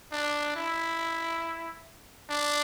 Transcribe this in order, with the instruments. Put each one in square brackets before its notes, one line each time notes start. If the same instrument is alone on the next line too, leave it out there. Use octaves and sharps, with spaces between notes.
[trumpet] D4
E4
D4